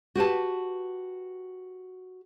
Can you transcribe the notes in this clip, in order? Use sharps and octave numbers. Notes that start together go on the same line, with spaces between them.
F#4 G4 B4 A5